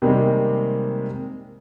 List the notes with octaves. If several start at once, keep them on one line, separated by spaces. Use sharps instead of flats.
C3 D#3 G3 G#3 A#3 C4